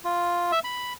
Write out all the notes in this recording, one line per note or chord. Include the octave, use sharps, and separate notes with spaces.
F4
E5
B5